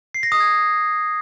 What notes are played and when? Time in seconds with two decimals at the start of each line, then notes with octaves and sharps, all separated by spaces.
0.14 C7
0.23 A#6
0.32 D#6
0.40 G#6